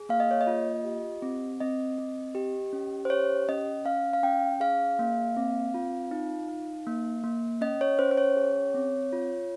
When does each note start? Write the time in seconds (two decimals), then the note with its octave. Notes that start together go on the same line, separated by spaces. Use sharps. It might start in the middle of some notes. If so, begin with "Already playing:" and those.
Already playing: G#4
0.09 A#3 F5
0.20 D#5
0.31 C#5
0.41 D#5
0.47 F4
0.85 G4
1.22 C4
1.60 C4 D#5
1.98 C4
2.35 G4
2.73 C#4
3.05 C5
3.10 G4 C#5
3.49 C#4 D#5
3.85 C#4 F5
4.13 F5
4.23 C#4 G5
4.60 G#4 F5
4.99 A#3
5.37 C4
5.74 F4
6.11 D#4
6.49 D#4
6.87 A#3
7.23 A#3
7.61 C#4 D#5
7.81 C#5
7.99 C#4 C5
8.11 C5
8.18 C#5
8.36 G#4
8.75 C4
9.13 F4